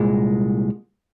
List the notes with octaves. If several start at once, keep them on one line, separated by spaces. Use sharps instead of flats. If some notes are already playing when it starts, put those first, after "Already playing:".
Already playing: C2 A#2 G#3